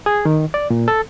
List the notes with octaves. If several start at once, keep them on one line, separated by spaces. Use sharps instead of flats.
G#4
D#3
D5
A#2
A4